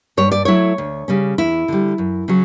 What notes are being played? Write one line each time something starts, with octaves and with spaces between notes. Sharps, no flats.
G2 C#5
D5
F#3 A3 E4 C#5
D2
C#3 G3 C#4
E2 E4
D3 G3
F#2
C#3 F#3